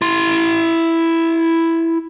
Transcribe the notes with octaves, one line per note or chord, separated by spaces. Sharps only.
E4 C6